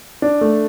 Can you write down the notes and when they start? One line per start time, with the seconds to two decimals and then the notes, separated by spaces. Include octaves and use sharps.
0.22 D4
0.41 A3